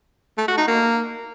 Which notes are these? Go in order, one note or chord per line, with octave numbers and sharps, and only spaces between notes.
A3
F#4
D#4
A#3